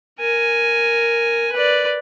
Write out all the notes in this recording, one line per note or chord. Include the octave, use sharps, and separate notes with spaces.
A#4 G#5
B4 D5